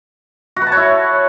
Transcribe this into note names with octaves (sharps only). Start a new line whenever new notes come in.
F#4
B4
A5
C#5
E4